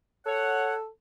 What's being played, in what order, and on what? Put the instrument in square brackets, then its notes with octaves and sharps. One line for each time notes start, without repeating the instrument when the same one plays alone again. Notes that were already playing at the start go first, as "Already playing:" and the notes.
[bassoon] A4 [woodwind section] C#5 F#5